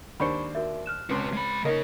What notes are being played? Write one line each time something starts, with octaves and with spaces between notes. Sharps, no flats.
D#2 D4 C5 B5 C#6 C#7
F#4 A#4 E5
F6 F#6 E7
C#2 C4 F#4 B4
G#3 B5
C#3 A#3 D#4 A#4 C#5 D#5